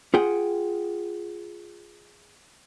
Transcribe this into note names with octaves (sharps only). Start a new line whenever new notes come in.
F4 G#4 F#5 G5